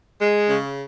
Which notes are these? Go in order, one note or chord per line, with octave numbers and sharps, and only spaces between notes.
G#3
C#3